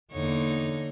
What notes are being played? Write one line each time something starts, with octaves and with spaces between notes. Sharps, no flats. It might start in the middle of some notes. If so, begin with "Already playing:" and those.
E2 D3 A#3 D#4 C#5